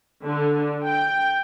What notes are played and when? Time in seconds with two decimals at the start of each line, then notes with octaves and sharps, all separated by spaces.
0.25 D3
0.85 G5